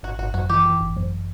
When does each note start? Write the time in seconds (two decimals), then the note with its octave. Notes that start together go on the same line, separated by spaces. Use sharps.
0.03 G1 F#4
0.19 G1 F#4
0.34 F#2 F#4
0.50 E3 G4
0.66 E3
0.81 G1
0.97 F#2